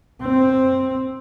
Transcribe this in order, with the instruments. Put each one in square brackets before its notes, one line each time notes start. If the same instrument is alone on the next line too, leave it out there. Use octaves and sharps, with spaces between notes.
[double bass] C4